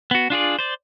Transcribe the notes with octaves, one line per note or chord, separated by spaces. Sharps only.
B3 F#4
D4 F4 G#4 D5
C5 D5